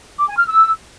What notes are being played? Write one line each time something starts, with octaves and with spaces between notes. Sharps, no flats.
D6
G#5
F6
E6